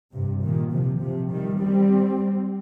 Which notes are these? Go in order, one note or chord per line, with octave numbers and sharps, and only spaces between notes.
G2 C3
A#2 D#3
C3 F3
C3 F3
D#3 G3
G3 C4